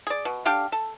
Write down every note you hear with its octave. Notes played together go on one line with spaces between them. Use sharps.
G#4 D5
B2
D3 D4 G4 F5
A4